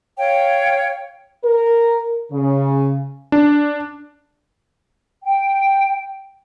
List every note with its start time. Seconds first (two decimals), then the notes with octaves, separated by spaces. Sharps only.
0.17 C#5 F5 G5
1.44 A#4
2.32 C#3
3.32 D4
5.24 G5